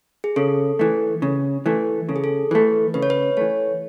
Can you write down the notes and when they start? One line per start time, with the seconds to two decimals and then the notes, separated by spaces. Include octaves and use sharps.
0.24 G#4
0.36 C#3 A4
0.79 E3 A3
1.22 C#3
1.66 E3 A3
2.09 C#3 A4
2.16 G#4
2.24 A4
2.51 E3 A3 B4
2.94 C#3 B4
3.03 C#5
3.10 B4
3.37 E3 A3 C#5